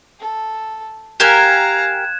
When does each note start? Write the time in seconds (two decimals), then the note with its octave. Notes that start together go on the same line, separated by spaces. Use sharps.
0.19 A4
1.20 G4 A#4 F5 G#5 A#5 F#6 G#6 E7